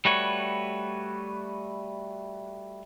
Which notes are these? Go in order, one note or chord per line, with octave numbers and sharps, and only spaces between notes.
G3 A3 F#4 B4 C#5